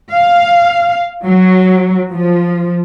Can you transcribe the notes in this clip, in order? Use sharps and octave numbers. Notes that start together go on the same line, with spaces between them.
F5
F#3
F3